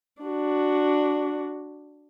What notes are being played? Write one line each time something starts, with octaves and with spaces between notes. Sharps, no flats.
D4 F#4